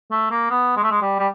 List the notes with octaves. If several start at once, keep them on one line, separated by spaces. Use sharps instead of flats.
A3
A#3
B3
G#3
A3
G#3
G3
G3